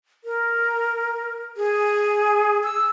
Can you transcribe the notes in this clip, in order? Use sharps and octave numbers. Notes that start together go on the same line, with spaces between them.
A#4
G#4
E6